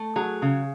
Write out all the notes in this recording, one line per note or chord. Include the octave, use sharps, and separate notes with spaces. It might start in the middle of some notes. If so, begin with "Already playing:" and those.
Already playing: A3
F#3 G#4
C#3